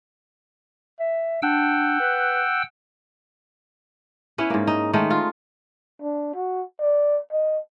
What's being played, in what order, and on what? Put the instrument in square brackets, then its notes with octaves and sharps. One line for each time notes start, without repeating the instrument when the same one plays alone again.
[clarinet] E5
[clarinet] D4 [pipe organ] F#5 G5 E6
[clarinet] B4
[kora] B3 C#4 E4
G#2 A#3
D#4
D#3 G#3 A3 D#4
F4
[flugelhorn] D4
F#4
D5
D#5